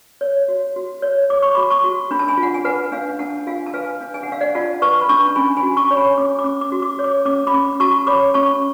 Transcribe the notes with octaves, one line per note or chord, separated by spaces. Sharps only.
C#5
F#4
F#4
C#5
C#5 D6
C#6
F#4 B5 D6
A5 C#6
F#4
D4 B5
A5
G#5 B5
F4
F#5
G#5
B4 F#5 A5
D4 F5 G#5
D4 F#5 A5
F4 F5 G#5
A5
B4 F5 G#5
D4
G#5
F#5
D4 F5
D5 F#5
F4 F#5 A5
B4 A5 C#6
B5
D4 A5 C#6
C#4 G#5 B5
G#5 B5
F#4
A5 C#6
C#5
G#5 B5
C#4 D6
D6
C#4
D6
F#4
D6
C#5
D6
C#4 D6
B5 D6
C#4
F#4 A5 C#6
C#5 B5 D6
C#4 A5 C#6